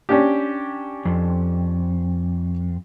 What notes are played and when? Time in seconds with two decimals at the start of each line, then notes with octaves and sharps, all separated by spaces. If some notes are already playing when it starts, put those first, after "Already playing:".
0.09 C#4 D4 G4
1.05 F2